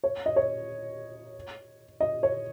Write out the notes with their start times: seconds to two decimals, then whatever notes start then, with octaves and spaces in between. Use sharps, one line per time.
0.04 C#5
0.26 D#5
0.36 C#5
2.00 D#5
2.23 C#5